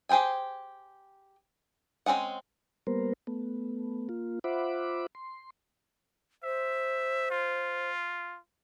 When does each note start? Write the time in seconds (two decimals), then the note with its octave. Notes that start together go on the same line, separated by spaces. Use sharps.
0.09 G4 G#4 C5 G5 G#5
2.06 G#3 C4 C#4 G#4 F#5
2.87 G3 A#3 B3 A#4 C5
3.27 A3 B3
4.09 A#3 F4
4.44 F4 C5 E5 F#5 B5 D6
5.15 C6
6.43 C5 E5
7.30 F4